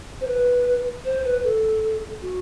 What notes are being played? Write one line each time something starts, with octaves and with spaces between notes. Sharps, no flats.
C5
B4
C5
B4
A4
F#4